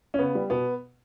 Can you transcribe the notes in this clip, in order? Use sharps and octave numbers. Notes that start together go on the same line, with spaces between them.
C#4
C#3 B3
G3
B2 B3